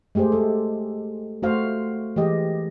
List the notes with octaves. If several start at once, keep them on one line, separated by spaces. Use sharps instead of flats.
G#3 A3 G4 G#4 C5
G#3 A4
A3 F#4 C5 F5
E3 G#3 G4 D#5